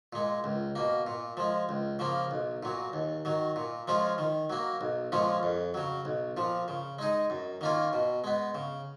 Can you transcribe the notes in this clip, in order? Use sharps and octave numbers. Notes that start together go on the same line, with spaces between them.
A#2 G#3
C#2
B2 A#3
A#2
F3 G#3
C#2
C#3 F3 A#3
B1
A#2 F#3
D#2
D#3 F#3
A#2
F3 G#3 C#4 F4
D#3
F#3 A#3
B1
A#2 F3 G#3 C#4
F2
C#3 F#3
B1
A#2 F3
C#3
G#3 D#4 G#4
F#2
D#3 A#3 C#4 F4
B2
G#3 B3
C#3